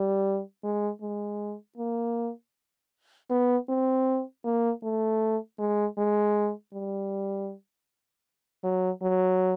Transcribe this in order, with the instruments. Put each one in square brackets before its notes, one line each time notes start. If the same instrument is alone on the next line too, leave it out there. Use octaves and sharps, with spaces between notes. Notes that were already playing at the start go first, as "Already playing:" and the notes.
Already playing: [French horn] G3
G#3
G#3
A#3
B3
C4
A#3
A3
G#3
G#3
G3
F#3
F#3